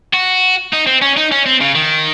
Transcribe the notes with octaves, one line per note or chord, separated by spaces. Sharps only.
F#4
D#4
C4
C#4
D#4
C#4
C4
C#3
D#3